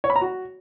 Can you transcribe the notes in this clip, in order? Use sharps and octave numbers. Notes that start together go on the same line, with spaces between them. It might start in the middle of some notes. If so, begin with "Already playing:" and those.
C#5
B5
A#5
F#4